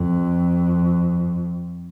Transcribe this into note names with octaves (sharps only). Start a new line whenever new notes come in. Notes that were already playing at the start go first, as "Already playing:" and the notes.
Already playing: F2